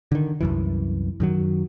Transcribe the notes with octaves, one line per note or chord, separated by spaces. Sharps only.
D3 D#3
C2 F#2 E3
F#2 D#3 F#3